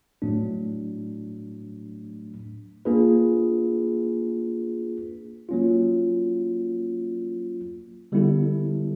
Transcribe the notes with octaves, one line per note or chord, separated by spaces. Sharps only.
A2 F#3 A3 D4
A#3 D4 F4 G#4 B4
F#3 A#3 C#4 F4
D3 G3 B3 E4 A4